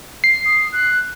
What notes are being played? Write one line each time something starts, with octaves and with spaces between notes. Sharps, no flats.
C7
D#6
F#6